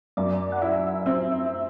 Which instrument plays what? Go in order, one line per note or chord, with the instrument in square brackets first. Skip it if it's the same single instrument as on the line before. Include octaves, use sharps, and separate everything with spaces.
[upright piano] F#2 [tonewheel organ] D5
[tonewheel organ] F#5
[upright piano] E4 [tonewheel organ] E5
[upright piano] C4 [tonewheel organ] E5